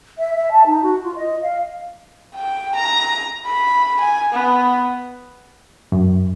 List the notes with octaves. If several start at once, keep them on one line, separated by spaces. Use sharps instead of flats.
E5
E5
A5
D#4
F#4
F4
D#5
F5
G5
A#5
B5
G#5
B3
F#2